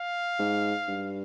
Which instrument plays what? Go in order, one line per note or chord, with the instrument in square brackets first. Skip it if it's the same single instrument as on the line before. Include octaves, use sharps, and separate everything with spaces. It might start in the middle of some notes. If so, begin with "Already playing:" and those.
Already playing: [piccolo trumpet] F5
[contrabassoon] G#2
G2